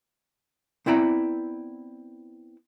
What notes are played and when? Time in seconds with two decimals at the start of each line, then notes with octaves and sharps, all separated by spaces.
0.86 B3 C4 E4 D5 A#5